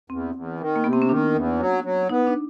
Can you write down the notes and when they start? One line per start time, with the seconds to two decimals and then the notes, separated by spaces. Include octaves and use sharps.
0.10 E2 C4
0.35 E2
0.60 D#3
0.76 A#3
0.84 C3 B3
0.93 C4
1.02 C#4
1.09 D#3 D4
1.34 E2
1.59 F#3
1.84 F#3
2.09 B3 D#4
2.27 D4